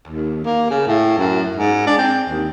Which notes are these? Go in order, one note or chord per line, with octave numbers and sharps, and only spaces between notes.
D#2
A#3
C#3
A2
F#2
G#2
D4
C4
D#2